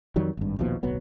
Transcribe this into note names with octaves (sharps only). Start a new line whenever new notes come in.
F2 D#3 F#3 G3
G#1 G2
A#1 D#2 B2 F3
D1 B1 F#3 B3